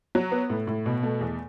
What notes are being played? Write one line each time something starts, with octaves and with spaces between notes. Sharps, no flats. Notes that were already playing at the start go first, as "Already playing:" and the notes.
F#3
B3
A2
A2
B2
A3
E2